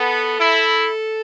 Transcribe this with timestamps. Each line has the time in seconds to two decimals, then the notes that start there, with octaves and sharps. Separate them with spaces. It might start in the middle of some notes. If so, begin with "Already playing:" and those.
Already playing: B3 A4
0.40 E4